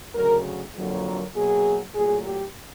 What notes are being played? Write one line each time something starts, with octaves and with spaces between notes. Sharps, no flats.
D2 C#3 F#3 A#4
F2 D3 F#3 A#3
A#4
B2 F#3 A#3 G#4
A#2 F#3 A3 G#4
G4